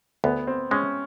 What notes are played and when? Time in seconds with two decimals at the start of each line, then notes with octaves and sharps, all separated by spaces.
0.24 D2 B3
0.47 C4
0.71 G#3 C#4